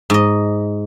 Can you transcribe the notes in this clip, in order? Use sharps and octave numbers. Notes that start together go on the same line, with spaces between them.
G#2 D#5